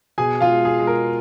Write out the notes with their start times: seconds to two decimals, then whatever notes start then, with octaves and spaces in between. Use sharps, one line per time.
0.18 B2 G#4 G#5
0.41 F4 F5
0.49 G#3
0.65 G#4
0.80 G#3
0.87 A#4